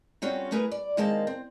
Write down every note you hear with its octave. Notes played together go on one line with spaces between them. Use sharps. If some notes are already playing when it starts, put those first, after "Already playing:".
G3 C4 C#4 F4 F#4 A4
A3 G#4 A#4 B4
D5
D#3 G#3 A#3 C4 A5
C4